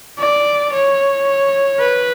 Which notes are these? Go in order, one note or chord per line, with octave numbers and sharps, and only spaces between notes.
D5
C#5
B4